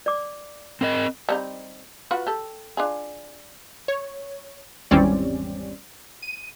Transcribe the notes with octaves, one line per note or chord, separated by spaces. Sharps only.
D5 D6
C4 A#4 D#5
G3 C4 D#4
F4 F#4 B4
G4 A4
D4 F4 G#4
C#5
G#1 E2 G3 C4 C#4 D5
D#7